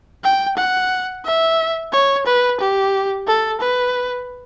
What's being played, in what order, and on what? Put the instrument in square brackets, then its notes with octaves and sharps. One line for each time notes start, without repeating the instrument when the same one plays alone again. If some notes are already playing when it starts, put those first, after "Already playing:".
[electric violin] G5
F#5
E5
C#5
B4
G4
A4
B4